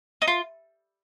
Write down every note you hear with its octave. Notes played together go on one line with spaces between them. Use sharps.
D#4
F4